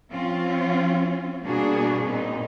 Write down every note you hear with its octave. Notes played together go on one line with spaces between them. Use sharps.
F3 C4 C#4 F4
B2 G3 A#3 D4 F#4 G#4
A#2 B3 C4 D#4